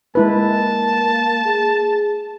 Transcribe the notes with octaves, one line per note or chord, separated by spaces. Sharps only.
G#3 A#3 E4 B4 A5
G#4